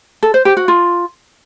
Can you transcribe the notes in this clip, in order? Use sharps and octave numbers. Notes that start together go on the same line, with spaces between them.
A4
C5
G4
F#4
F4